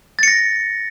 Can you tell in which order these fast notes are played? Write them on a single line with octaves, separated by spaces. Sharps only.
A6 C#7 A#6